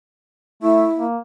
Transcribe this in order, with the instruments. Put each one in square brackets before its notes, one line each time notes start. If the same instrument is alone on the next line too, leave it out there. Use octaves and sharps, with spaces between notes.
[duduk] A3 [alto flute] E4
[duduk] A#3